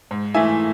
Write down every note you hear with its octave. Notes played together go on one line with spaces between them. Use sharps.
G#2
E3 A3 E5 G#5